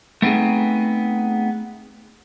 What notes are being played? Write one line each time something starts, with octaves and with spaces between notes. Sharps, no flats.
A3 B3 C4 D#4 G#4